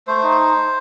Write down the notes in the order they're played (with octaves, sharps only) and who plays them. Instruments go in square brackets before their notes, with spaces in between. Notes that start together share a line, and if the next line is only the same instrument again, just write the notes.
[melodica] A3 C5
D#4